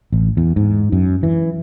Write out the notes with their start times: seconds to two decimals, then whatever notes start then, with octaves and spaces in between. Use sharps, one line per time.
0.12 A1
0.37 E2
0.56 G#2
0.92 F#2
1.23 E3